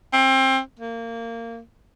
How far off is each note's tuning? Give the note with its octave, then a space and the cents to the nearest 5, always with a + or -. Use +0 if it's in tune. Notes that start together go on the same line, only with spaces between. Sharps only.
C4 +25
A#3 -20